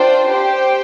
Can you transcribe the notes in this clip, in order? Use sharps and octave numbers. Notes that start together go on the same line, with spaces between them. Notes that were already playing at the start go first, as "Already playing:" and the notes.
Already playing: D4 F4 C5 G5
G4 C5 G5